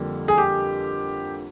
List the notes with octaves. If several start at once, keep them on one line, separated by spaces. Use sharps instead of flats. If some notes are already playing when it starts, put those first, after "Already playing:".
Already playing: F2 D3 G3 A#3
G#4
G4